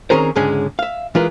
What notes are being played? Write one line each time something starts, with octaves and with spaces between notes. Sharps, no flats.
D#3 C4 C#4 G#4 A#4 C5
C#2 G#2 D3 G#3 C#4 G#4
E5 F5
E3 G#3 F4 G#4 A#4 B4